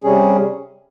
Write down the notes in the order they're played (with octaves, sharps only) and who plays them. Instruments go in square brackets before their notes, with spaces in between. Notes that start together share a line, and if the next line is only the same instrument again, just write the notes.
[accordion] C3 G3 C#4 G#4